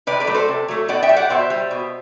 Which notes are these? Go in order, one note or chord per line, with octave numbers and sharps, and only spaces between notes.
C3 B4 D5
B4 D5
F#3 A3
A4 C5
C3
F#3 A3
B2 D5 F#5
E5 G5
G3
D5 F#5
B2 C5 E5
G3
B2